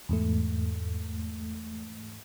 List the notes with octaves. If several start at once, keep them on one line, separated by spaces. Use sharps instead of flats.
E2 G#2 A3